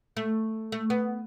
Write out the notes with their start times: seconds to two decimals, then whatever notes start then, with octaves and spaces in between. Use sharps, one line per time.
0.17 A3
0.72 A3
0.90 B3